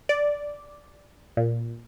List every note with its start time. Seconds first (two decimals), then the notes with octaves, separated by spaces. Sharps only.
0.09 D5
1.37 A#2